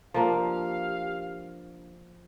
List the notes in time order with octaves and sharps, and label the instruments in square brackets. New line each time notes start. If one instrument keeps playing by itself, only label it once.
[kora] F3 A#3 D4 [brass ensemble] G4 F5